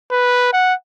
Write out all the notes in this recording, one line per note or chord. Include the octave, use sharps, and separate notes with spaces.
B4
F#5